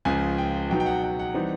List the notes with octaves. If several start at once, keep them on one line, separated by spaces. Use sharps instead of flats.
C#2 C#3 F3 G#5
G5
B2 F#3 B3 D#4 G5
G5
F#5
G5
F#5
E3 G3 C4 D#4